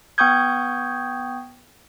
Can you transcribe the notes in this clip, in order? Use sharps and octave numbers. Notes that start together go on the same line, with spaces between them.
B3 G5 C#6 D#6 G6 G#6